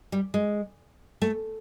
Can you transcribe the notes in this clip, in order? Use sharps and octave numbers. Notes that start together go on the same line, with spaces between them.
G3
G#3
A3